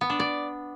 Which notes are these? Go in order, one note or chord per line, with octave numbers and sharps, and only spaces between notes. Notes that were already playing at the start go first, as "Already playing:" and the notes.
B3
D4
D5